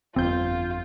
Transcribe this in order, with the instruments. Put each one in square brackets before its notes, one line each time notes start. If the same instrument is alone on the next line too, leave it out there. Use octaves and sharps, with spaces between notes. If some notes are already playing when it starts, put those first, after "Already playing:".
[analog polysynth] G1 F2 G6 [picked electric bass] C4 [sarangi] F4